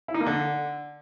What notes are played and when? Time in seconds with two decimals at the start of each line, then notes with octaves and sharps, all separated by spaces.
0.08 E4
0.14 D#4
0.20 A#3
0.26 D3